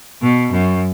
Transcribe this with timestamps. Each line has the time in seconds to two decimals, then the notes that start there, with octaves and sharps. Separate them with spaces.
0.22 B2
0.52 F#2